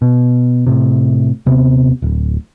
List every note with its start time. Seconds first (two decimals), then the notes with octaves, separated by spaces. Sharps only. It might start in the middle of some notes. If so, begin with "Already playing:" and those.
0.02 B2
0.67 A2 C3
1.46 D#1 C3 B3
2.02 D1